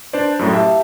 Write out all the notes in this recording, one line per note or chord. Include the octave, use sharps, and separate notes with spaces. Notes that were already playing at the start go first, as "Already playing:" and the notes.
D4 B4 C5 D5
F#2 A2
G4 E5 F5 A5